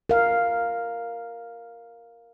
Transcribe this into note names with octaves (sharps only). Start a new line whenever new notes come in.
A#4 F5